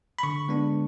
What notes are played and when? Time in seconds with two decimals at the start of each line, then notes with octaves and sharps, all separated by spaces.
0.19 B5
0.23 D3 C#6
0.48 G#3 B3 D4